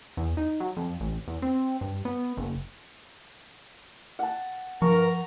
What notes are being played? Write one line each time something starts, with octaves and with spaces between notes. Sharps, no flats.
E2
D#4
F#3
F2
A1
E2
C4
G2
B3
F#1
F#5 A5
G2 F3 A#4 A#5 C#6